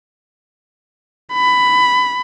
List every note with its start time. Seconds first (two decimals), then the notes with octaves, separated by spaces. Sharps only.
1.33 B5